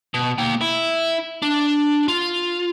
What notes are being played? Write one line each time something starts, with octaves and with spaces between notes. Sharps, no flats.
B2
A#3 G5
E4
D4
F4